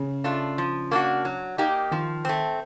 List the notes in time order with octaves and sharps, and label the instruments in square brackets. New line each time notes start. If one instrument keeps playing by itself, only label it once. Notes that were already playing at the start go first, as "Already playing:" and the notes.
Already playing: [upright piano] C#3
[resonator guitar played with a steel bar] A3 D4 F4
F3
A#3 D4 F#4
F#3
A#3 D#4 G4
[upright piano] D#3 [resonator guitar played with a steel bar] F3
[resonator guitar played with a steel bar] A3 C4